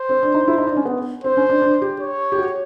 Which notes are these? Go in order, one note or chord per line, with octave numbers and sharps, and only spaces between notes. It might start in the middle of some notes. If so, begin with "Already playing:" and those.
Already playing: C5
C4
D4
D#4
E4
D#4
D4
C#4
B3
C4 C5
C#4
D4
D4
G4
C#5
G4
F#4